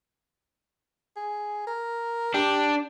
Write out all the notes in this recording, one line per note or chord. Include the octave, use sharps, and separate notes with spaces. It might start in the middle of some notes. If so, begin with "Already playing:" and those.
G#4
A#4
D4 G4